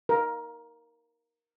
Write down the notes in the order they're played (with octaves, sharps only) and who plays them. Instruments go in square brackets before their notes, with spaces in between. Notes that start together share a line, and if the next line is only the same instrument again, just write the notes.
[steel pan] A#4